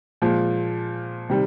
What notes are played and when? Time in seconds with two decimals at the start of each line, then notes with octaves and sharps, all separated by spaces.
0.22 A#2 F3 G#3
1.30 C3 D#3 G3